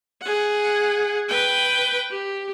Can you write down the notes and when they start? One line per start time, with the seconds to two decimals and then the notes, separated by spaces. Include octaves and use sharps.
0.22 G#4 F#5
1.29 B4 G5
2.10 G4